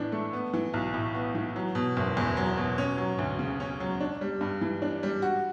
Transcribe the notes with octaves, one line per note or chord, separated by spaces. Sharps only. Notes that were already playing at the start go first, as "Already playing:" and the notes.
Already playing: A2 E3 D4
A3
B3
E3
B1
A2
B3
E3
F#3
B2
F#1
E2
F#3
B2
C#4
F#3
D2
C#3
C#4
F#3
D4
G3
G2
E3
D4
G3
F#4